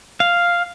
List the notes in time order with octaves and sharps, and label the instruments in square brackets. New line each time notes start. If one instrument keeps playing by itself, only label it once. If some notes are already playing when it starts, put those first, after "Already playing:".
[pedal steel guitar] F5